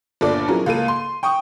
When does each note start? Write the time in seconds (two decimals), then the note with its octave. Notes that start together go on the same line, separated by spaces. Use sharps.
0.21 G1 A#2 D4 A4 D5 D6
0.48 F3 F#3 C#4 E4 G#4 A#4
0.66 C#2 A#3 A4 D#7
0.88 C6
1.23 G5 C#6 D#6